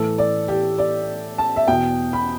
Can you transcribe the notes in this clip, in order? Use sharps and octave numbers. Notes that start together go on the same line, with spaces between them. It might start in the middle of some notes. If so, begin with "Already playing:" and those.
Already playing: A2 E3 A4
D5
G4
D5
A5
E5
E2 B2 G5
B5